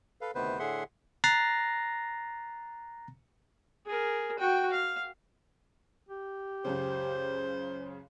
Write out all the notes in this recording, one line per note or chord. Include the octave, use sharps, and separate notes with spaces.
A4 B4 F5
D2 C3 D#3 B3 B4 C5
A2 D3 G#4 E5 F#5 C6
A#5 F#6 A6 A#6 C7
G#4 A#4
F#4 G5
F5
G4
C#2 F#2 C#3 C5